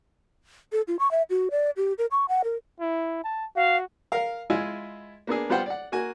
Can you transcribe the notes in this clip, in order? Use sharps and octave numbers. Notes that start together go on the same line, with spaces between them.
A4
F4
C#6
E5
F#4
D5
G4
A#4
C#6
F#5
A#4
E4
A5
F#4 F5
A#4 F5
G#3 E4 F4 E5 G#5
A#3 B3 D4 G#4
G3 B3 F4 C5 F#5 G5
D5 F#5
A#3 F#4 G#5